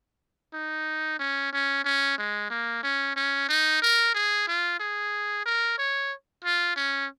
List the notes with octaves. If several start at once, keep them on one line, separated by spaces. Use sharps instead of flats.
D#4
C#4
C#4
C#4
G#3
A#3
C#4
C#4
D#4
A#4
G#4
F4
G#4
A#4
C#5
F4
C#4